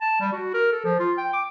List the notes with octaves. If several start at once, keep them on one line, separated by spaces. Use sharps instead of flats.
A5
G3
F#4
A#4
A4
F3
F4
G5
D6